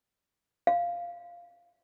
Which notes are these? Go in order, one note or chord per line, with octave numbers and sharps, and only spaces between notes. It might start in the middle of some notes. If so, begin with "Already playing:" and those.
F5